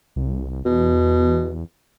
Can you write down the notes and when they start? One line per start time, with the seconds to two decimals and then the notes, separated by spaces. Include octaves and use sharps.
0.16 C2
0.66 E2 B2